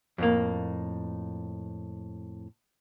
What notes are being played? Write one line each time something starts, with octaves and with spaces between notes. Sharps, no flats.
F2 A2 A#3